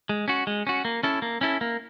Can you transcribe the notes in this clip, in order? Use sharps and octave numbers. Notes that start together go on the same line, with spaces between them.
G#3
C#4 F#4
G#3
C#4 F#4
A#3
C#4 E4 A4
A#3
C#4 E4 A4
A#3